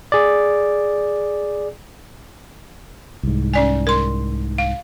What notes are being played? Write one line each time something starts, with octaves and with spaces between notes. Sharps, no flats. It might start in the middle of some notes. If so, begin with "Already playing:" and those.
G#4 D5
C2 G#2
C#4 D5 G#5
A#4 C6
F5